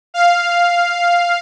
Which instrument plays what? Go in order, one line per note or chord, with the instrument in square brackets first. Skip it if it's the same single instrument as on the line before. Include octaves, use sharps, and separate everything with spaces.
[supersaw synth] F5